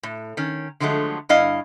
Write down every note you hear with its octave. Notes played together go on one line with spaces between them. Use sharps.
A2
D#3 C#4
D3 F3 F#3 G#3 A3
G2 E4 D#5 F5